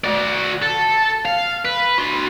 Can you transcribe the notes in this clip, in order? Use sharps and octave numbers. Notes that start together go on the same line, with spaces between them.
F#4 D5
A4
F5
B4
F#4 C6